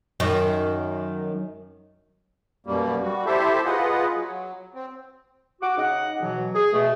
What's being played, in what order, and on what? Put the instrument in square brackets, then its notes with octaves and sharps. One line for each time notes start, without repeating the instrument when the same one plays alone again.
[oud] F#2 D#3
[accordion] F#2 B2 G3 A#3
G3 F#4
E4 G4 A4 C5 E5
F4 G#4 B4 D#5 F#5
F#3
C4
[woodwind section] F#4 F#5 D6
C#3 D#4 D#5 F#5
B2 E3 F#3
G#4
B2 A3